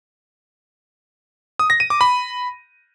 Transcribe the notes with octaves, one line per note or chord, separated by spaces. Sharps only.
D#6
A#6
D#7
D6
B5